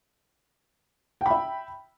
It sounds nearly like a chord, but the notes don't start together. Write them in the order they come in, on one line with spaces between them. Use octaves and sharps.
G5 B5 E5